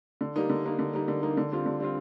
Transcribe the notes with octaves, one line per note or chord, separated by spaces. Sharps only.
D3
G3 A#3 D#4
D3
G3 A#3 D#4
D3
G3 A#3 D#4
D3
G3 A#3 D#4
D3
G3 C4 F4
D3
G3 C4 F4